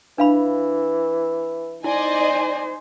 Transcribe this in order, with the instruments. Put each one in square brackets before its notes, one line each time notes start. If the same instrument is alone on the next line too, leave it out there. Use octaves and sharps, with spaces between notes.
[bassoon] E3 [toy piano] D4 F5 B5
[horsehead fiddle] D#4 C5 [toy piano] E4 [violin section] D5 D#5 G#5